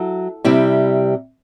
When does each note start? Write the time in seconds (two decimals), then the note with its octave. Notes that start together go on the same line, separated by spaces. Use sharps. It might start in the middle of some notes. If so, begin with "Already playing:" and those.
Already playing: F#3 E4 A4
0.45 C3 G3 C4 E4